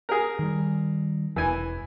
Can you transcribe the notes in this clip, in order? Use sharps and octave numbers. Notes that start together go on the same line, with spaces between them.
G#4 A#4
D#3 G3
E1 E3 G#5